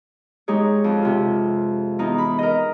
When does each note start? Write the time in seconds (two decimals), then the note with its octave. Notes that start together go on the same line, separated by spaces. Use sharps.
0.48 G#3 D#4 G4 G#4 C#5
0.84 F2
1.02 C3 F4
1.99 E2 D#4
2.18 B5
2.39 A#4 D#5